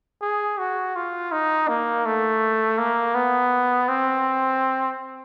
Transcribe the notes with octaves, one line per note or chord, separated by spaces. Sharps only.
G#4
F#4
F4
D#4
A#3
A3
A#3
B3
C4